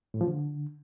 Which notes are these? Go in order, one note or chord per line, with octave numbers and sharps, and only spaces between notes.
A2
F3
D3